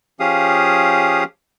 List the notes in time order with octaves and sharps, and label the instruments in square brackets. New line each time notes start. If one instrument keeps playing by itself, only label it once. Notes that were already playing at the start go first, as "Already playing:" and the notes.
[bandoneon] F3 C#4 G4 G#4 F5 D#6